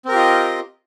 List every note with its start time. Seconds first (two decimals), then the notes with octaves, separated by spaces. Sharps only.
0.05 C4
0.08 A#4
0.11 G4
0.14 F4
0.18 D#5